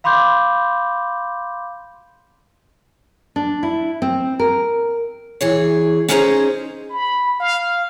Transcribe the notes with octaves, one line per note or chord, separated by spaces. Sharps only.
F5 B5 C6 D6 G6
D4
E4
C4
A#4
E3 G#4 C#5
C#4 D#4 E4 G#4 C5 A#5
B5
F5